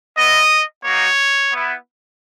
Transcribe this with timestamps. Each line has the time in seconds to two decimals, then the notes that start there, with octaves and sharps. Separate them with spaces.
0.18 B3 E4 D#5
0.84 A#3 D#4 F#4 C#5
1.52 B3 E4